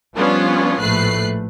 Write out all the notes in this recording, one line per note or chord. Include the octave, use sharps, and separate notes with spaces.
F3 G3 B3 C#4 D4 F4
A#1 A2 A3 B4 F#6 C7